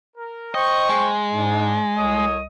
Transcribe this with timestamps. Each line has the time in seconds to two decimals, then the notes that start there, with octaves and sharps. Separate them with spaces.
0.16 A#4
0.54 C5 D#5 G5 C#6
0.89 G#3
1.33 G#2 D4 D#4
1.97 C2 F#4 A4 C#5 D#5 D#6